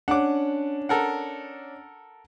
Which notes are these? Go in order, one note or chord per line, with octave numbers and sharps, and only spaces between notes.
C#4 D4 F#5 D6
A4 A#4 F#5